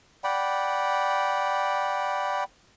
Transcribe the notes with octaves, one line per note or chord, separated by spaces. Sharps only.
D5 F#5 G5 B5